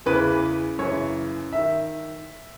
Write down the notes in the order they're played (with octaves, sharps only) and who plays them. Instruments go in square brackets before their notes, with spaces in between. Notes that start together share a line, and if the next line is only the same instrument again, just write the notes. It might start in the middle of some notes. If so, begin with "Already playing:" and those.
[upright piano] E2 C#3 E3 B4
F#2 C#3 E3 C#5
D#3 E5